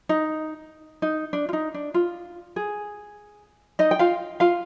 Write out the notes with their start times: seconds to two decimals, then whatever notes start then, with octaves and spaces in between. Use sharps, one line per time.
0.09 D#4
1.02 D#4
1.33 D4
1.49 F4
1.53 D#4
1.74 D4
1.94 F4
2.56 G#4
3.79 D#4 D#5
3.91 G5
3.99 F4 F5
4.40 F4 F5